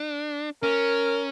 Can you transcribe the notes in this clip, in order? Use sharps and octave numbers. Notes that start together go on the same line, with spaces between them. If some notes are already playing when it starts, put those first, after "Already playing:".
Already playing: D4
C#4 A#4